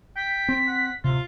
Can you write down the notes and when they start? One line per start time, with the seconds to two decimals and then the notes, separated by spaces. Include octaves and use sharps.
0.16 G5 B6
0.49 C4
0.67 F#5
1.04 D1 C3 F4